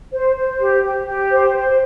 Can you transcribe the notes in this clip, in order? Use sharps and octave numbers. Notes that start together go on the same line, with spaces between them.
C5
C5
G4
G4
G4
C5
C5